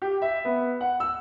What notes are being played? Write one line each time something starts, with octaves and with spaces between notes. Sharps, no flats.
G4
E5
B3
F#5
E6